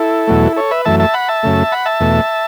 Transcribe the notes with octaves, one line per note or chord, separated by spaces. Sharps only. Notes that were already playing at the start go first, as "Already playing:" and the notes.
Already playing: E4 A4
E2 B2 F#3 A3
A4 C#5
B4 E5
F#2 E3 A3 E5 A5
E5 A5
F#5 B5
E5 A5
F#2 C#3 A3
F#5 B5
E5 A5
E2 B2 A3